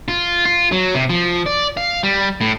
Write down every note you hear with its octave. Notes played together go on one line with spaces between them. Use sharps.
F4
F4
F#3
C3
F3
D5
F5
G3
A2